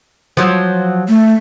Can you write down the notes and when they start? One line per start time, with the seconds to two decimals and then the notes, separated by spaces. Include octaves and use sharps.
0.37 F3 F#3
1.08 A3